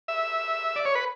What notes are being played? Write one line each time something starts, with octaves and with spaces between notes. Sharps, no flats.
E5
D5
C#5
B4